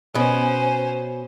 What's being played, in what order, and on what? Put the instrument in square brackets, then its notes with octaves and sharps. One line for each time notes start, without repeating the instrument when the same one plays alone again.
[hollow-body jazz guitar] B2 [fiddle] C#4 C5 [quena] G#5